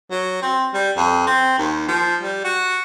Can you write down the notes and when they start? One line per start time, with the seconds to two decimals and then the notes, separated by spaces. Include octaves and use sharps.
0.11 F#3
0.42 C4
0.74 G3
0.97 F2
1.27 C4
1.58 D#2
1.88 F3
2.22 G3
2.44 F#4